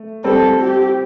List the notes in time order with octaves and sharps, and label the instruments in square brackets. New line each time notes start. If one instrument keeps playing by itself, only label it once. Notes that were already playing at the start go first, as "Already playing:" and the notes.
Already playing: [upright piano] A3
[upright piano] G3 C4 [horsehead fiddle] A4
[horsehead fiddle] G4